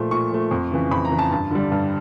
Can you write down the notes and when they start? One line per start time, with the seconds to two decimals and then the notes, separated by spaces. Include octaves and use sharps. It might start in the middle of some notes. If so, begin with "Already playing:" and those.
Already playing: A#2 F3 A3
0.11 A#2 C#6
0.30 F3 A3
0.51 F2
0.72 C#3 E3
0.91 F2 B5
1.05 A#5
1.12 C#3 E3
1.19 A5
1.31 G2 A5
1.51 D3 G3
1.72 G2